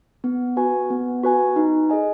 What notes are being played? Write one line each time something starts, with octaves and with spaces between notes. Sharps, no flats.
B3
F#4 B4 G#5
B3
F#4 B4 G#5
D#4
G#4 D#5 G#5